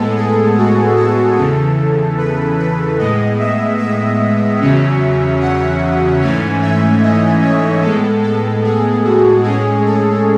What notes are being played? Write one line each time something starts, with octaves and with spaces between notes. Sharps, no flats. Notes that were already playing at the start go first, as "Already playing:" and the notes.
Already playing: A2 G#3 B3 A4
G#4
F#4
A4
E2 C#3 E3 A4
B4
B4
A2 G#3 B3 D#5
E5
E5
E2 C#3 F#3 C#4
F#5
G#2 E3 A3 C#4 G#5
E5
D#5
C#5
A2 G#3 B3 A4
A4
G#4
F#4
A2 G#3 C#4 G#4
A4